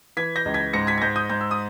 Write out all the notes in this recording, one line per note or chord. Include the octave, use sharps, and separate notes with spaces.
E3 G#6 B6
G6 A#6
C#2
G#6 B6
G#2 A#6 C#7
G#6 B6
G#6
G#2 G6 A#6
D#6 G6
G#2 G6
E6
D#6